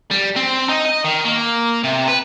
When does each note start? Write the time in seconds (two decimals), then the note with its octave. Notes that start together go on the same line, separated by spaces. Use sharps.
0.11 G3
0.36 C4
0.69 D#4
0.85 D#5
1.04 D#3
1.25 A#3
1.84 C3
2.08 B4